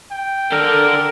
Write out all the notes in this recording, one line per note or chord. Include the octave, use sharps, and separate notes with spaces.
G5
D4 A4 A#4